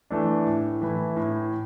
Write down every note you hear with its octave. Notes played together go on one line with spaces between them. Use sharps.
E3 A3 D4
A2
E3 A3 E4
A2